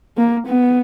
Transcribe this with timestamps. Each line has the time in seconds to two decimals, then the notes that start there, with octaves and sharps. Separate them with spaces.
0.17 A#3
0.46 B3